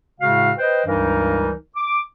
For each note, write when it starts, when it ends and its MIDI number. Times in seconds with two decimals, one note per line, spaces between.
0.21 0.51 45
0.21 0.51 49
0.21 0.51 56
0.21 0.51 66
0.21 0.51 76
0.21 0.51 77
0.58 0.82 71
0.58 0.82 72
0.58 0.82 75
0.58 0.82 79
0.86 1.52 37
0.86 1.52 43
0.86 1.52 52
0.86 1.52 55
0.86 1.52 63
0.86 1.52 70
1.76 1.99 86